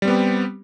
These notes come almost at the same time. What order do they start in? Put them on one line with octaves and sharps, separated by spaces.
G3 C4 B3 G4